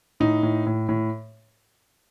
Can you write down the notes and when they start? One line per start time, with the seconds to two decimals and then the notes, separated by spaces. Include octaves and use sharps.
0.20 A2 D#4
0.43 A2
0.67 A2
0.89 A2